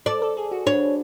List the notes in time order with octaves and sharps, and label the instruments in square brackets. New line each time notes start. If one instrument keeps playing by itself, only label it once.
[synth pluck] A4 [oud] D5
[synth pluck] A4
G#4
F#4
[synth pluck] D4 [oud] C#5